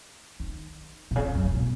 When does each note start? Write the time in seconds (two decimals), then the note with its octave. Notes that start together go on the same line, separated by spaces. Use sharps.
0.40 D#3
1.11 B2
1.16 C#3
1.26 C#3
1.35 F#2
1.45 A2
1.55 B2